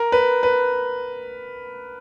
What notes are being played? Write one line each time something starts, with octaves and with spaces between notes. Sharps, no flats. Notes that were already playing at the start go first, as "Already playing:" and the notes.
Already playing: A#4
B4
B4